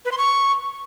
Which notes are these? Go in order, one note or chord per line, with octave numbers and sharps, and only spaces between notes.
B4
C6
C#6